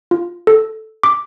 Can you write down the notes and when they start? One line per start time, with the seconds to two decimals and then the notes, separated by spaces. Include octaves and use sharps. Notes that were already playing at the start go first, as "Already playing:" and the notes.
0.11 F4
0.47 A4
1.03 D6